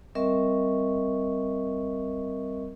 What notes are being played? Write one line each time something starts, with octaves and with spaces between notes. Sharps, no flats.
G3 C4 A#4 D#5 E5 C#6